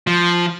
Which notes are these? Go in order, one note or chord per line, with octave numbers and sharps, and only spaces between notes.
F3